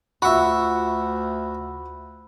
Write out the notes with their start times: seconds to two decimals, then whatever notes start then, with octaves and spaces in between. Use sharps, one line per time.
0.22 D2 F4 F#4 E5 B5 C#6